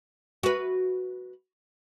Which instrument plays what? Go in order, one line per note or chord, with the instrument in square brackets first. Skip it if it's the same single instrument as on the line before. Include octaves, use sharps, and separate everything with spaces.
[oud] F#4 B4